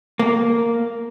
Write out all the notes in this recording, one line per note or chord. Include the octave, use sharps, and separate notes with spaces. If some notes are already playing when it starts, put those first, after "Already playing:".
A#3